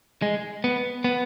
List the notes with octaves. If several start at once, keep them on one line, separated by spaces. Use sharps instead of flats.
G#3
B3
B3